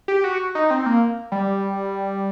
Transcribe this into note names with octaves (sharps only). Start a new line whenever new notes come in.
G4
F#4
D#4
C4
A#3
G3